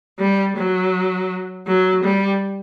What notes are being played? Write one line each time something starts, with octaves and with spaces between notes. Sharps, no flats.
G3
F#3
F#3
G3